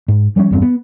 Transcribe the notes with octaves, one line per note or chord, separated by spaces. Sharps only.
G#2
F3 G3 A3 C#4
E2 G2 C4
B3